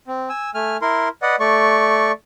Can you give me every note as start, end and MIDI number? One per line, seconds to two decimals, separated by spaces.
0.07 0.29 60
0.29 0.50 80
0.29 0.50 88
0.55 0.77 57
0.55 0.77 80
0.55 0.77 89
0.82 1.09 64
0.82 1.09 70
0.82 1.09 84
1.22 1.36 71
1.22 1.36 74
1.22 1.36 75
1.22 1.36 78
1.40 2.12 57
1.40 2.12 74
1.40 2.12 85